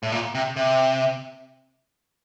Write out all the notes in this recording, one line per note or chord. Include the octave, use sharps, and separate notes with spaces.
A2
A#2
C3
C3